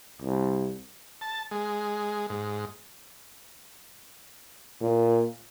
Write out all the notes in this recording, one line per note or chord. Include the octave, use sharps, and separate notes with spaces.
C2
A5
G#3
G#2
A#2